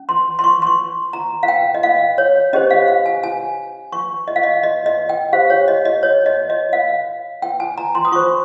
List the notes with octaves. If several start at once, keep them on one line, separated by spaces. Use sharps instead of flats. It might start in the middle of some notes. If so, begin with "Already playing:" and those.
Already playing: C#4
C6
C6
C#6
C6
C#6
A#5
F5
G5
D#5
F5
C#5
C#4 G4 C5 D#5
F5
F5
G#5
G#5
C#6
D#5
F5
D#5
D#5
D#5
G5
G4 C5 F5
C#5
D#5
D#5
C#5
D#5
D#5
F5
G5
G#5
A#5
C6
D#6
F4 C5 C#6